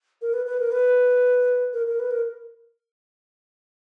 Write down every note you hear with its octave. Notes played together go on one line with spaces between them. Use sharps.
A#4
B4
B4
A#4
B4
A#4
A#4
B4
A#4